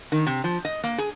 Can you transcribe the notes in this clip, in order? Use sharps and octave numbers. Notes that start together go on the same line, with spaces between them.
D#3
C3
F3
D#5
A#3
G#4